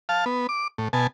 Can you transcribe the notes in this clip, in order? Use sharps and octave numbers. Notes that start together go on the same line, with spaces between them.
F5 A5
B3
D6
A2
B2 G#5 A5